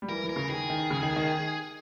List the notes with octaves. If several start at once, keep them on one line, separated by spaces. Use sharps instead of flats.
G3
E3 A#4
E3
A#4
C#3
D#3 G#4
D#3
C#3
D#3
D#3